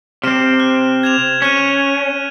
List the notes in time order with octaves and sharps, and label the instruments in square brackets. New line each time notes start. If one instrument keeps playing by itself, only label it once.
[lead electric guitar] C3 C4 [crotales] F6 E7
[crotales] F#6
G#6 E7 F7
[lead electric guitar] C#4 [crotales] F6 F#6 D#7